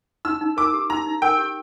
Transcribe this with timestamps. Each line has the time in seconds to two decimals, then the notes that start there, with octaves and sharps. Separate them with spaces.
0.25 D#4 E6
0.41 D#4
0.57 A#4 D6
0.73 G4
0.90 D#4 A#5
1.06 D#4
1.22 A#4 G5
1.38 G4